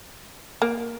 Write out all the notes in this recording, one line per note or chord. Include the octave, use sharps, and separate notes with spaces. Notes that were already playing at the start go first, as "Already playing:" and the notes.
A#3